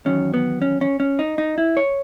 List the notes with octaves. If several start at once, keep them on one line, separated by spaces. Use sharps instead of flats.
E2 D#3 F#3 C#4
B3
C#4
C#4
C#4
D#4
D#4
E4
C#5